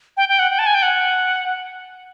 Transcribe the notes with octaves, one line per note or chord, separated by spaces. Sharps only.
G5
G5
F#5
G5
A5
G#5
G5
F#5